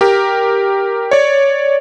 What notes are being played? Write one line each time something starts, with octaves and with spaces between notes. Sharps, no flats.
G4 A#4
C#5 D5